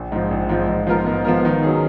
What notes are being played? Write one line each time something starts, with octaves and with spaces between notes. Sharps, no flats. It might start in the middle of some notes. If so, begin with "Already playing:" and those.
Already playing: A#1
G#2 F3
A#1
G#2 F3
G#2
F3 B3 F4 A#4
G#2
F3 B3 F4 A#4
D#3
F#3 C#4 G#4